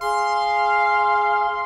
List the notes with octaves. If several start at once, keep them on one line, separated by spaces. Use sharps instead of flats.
G#4 F5 C6